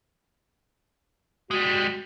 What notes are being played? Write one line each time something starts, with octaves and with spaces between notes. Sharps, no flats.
G3 G#3 F#4